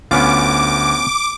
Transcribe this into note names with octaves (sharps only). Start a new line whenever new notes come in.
D2 B3 C#4 F4 D6